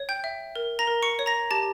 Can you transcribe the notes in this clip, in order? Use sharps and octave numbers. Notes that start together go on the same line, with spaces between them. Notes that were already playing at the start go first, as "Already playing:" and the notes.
Already playing: C#5
G5 G6
E5
A#4
A#5 A#6
A#4
C#6 C#7
C#5
A#5 A#6
G4 A5 A6